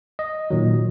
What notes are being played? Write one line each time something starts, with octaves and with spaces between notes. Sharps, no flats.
D#5
A#2 D#3 F#3